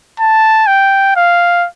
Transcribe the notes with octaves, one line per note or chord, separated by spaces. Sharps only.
A5
G5
F5